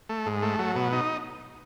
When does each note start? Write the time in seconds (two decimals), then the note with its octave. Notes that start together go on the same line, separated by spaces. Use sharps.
0.09 A3
0.26 G#2
0.42 A3
0.59 F#3
0.76 B2
0.92 D#4